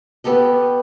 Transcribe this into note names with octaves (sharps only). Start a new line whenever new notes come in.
B3 G4 A4 D#5